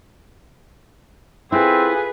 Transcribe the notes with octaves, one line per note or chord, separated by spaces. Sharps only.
C4 E4 F4 G#4 A4 B4